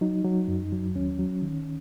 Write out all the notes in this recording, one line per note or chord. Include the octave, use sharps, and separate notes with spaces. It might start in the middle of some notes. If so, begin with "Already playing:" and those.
F#3 D#4
F#3
F#2
F#3
D#2 C#4
F#3
D#3